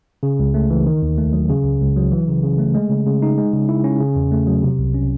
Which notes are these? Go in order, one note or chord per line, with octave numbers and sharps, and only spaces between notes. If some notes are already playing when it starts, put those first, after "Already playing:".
C#3
C#2
A3
E3
D#3
D#2
A3
F#3
C#3
C#2
C#2
F#3
E3
C#3
C#3
A3
G#3
C#3
C#3
D#4
G#3
C#3
E4
C#4
C#3
E2
A3
F#3
C3
C2
C#4